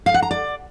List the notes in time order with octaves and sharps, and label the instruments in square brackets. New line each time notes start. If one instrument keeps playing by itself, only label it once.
[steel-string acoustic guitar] F5
F#5
A#5
D5